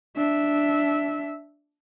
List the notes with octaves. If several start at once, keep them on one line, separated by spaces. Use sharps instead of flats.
D4 E5